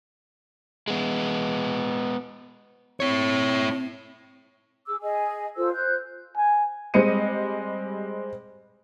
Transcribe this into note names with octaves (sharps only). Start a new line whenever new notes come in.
G#3 B3
C4 E4 C#5
G#4 D6 E6
G#4 D#5 G#5
F4 A4 C5 E6
C5 F#6 G6
G#5
G3 G#3 C4 D#5 C#7 D#7